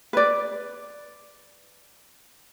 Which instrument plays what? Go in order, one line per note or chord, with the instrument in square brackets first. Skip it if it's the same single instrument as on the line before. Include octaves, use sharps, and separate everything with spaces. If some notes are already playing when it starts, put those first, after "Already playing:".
[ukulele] B4 D5